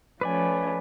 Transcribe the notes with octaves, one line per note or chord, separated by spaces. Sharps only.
F3 A3 C#4 B4 D5 G#5